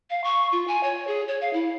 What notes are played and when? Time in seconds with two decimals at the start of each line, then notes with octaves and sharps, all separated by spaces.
0.10 F5
0.24 C#6
0.52 F4
0.68 G#5
0.83 C#5
1.07 G#4
1.28 C#5
1.41 F5
1.53 E4